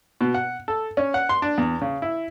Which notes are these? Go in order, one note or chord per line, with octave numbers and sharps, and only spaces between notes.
B2
F#5
A4
C#4
F#5
C6
D4
E2
C#3
E4